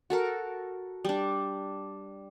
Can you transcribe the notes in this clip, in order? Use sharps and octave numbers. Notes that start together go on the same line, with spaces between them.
F#4 A4 A#4
G3 D4